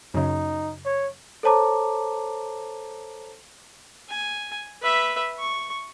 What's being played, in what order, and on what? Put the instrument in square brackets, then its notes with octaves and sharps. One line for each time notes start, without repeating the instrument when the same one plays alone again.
[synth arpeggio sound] F#2 C#3 [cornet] D#4
[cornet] C#5
[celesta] A4 C5 C#5 A5 A#5 D6
[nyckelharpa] G#5
B4 E5
C#6